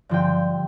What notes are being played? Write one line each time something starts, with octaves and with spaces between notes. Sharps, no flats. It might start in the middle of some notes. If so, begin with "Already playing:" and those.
G2 D3 F3 G5